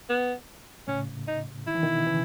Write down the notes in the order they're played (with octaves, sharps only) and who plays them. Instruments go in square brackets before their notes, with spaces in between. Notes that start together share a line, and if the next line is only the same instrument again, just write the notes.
[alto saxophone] B3
[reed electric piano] A2 C#3 [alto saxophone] C#4
[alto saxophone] D#4
[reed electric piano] D#3 [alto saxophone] E4
[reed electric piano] E3
B2 D#3
C#3 E3